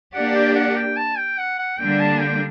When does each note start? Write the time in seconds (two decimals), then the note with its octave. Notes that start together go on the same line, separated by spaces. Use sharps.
0.14 A#3 D4 G4 D5 F#5
0.35 G5
0.55 F#5
0.77 G5
0.97 A5
1.17 G5
1.38 F#5
1.59 F#5
1.79 D3 G3 A#3 D4 G5
2.00 A5
2.20 G5